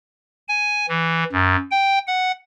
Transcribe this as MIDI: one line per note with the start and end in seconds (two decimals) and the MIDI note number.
0.48 0.86 80
0.89 1.24 52
1.32 1.56 42
1.71 1.99 79
2.07 2.32 78